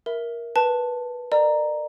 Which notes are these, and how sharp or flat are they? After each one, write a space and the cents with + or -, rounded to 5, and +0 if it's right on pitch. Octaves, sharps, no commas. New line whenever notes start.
A#4 +10 E5 +0
B4 -10 A5 +5
A#4 -30 D5 +40 A#5 +0